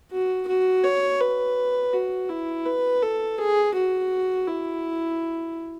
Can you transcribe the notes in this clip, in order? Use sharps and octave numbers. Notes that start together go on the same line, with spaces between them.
F#4
F#4
C#5
B4
F#4
E4
B4
A4
G#4
F#4
E4